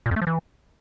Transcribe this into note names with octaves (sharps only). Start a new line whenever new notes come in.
A#2
F2
A3
F3
E3